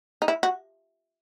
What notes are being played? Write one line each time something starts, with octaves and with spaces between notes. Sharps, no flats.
D#4
E4
F#4